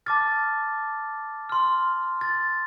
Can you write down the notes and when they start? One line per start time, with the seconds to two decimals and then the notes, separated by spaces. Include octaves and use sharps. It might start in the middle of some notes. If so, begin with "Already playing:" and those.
0.06 A5 D6 F6 A6
1.49 C6 F6
2.21 A6